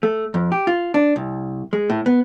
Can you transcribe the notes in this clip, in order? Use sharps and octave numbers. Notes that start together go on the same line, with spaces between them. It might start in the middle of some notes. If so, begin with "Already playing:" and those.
A3
F2
G4
F4
D4
C2
G#3
A2
B3